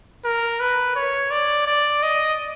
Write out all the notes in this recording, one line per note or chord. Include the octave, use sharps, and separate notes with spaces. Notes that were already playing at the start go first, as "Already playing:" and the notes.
A#4
B4
C#5
D5
D5
D#5